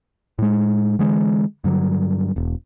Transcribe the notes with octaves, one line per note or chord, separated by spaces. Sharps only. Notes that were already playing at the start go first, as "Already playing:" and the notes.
A2 G#3
D3 E3 G#3
G2 D3 F#3
E1